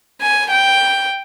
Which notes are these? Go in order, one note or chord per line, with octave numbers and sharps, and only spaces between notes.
G#5
G5